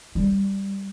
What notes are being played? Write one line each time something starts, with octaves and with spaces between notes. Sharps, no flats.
G3